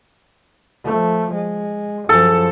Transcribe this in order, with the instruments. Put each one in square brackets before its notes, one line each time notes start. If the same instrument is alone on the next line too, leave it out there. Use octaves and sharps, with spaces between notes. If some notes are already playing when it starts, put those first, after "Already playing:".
[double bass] F3 A3
G#3
[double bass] F#2 F3 [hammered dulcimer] A4